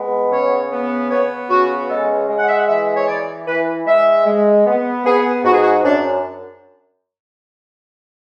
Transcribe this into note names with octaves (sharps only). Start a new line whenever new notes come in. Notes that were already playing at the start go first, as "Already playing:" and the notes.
Already playing: G#3 B3
C#3 C#5
B3
B3 C#5
C#3 F#4
G#3 A4
G#3
F#5
E5
F#5
E3 E5
C#5
E3 D5
E3 B4
G#3 E5
G#3
B3
B3 G#4
G#2 F#4
G#4
F#4
F#2 D4